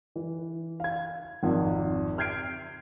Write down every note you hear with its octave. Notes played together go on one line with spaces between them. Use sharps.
E3
F5 G#6
G#1 F2
F6 G6 G#6 C7 D7